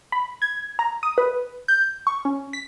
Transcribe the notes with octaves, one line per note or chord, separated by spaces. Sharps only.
B5
G#6
A#5
D#6
B4
G6
C#6
C#4
B6